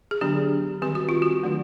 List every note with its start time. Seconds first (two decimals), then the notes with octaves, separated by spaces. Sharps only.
0.11 G#4
0.21 D3 F#3 B3 D4 G4
0.82 D#3 G3 C4 G4
0.95 F#4
1.09 F4
1.22 F#4
1.43 D#3 F#3 A3 D4